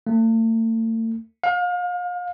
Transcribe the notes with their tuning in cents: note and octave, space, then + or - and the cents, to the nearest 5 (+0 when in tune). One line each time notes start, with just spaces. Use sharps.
A3 +40
F5 +35